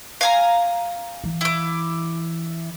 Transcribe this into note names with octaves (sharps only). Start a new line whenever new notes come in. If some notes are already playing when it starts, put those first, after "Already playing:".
F5 G#5 A#5
E3
E4 D6